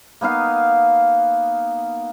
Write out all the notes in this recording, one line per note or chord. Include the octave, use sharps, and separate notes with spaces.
A#3 B3 D#4 F5